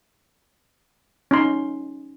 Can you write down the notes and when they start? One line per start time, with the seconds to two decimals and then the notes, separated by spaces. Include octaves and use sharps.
1.31 C#4 D#4 C6